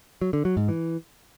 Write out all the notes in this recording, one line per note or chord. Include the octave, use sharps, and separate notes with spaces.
F#3
D3
F#3
G#2
E3